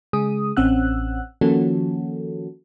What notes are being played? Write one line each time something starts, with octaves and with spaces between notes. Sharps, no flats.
C#3 G#3 G#4 D#6
A1 C4 C#4 F#5 E6 F#6
D#3 F3 A#3 C#4 F#4 A4